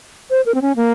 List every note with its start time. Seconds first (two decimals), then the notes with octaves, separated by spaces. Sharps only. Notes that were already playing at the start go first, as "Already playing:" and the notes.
0.30 C5
0.46 A#4
0.55 C4
0.62 C#4
0.76 A#3